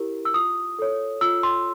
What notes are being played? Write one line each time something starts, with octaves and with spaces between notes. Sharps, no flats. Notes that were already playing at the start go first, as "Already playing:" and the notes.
Already playing: E4 G4 A#4
E6
F4 D#6
A4 C#5
F4 E6
C6